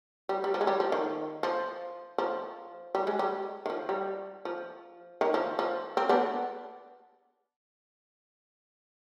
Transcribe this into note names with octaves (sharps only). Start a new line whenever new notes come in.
G3
G3
F3
G#3
G3
F3
D#3
F3
F3
G3
G#3
G3
D#3
F3
G3
F3
D#3
F3
F3
C4
B3 D4